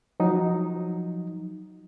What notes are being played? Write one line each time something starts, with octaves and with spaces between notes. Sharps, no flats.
F3 F#3 D#4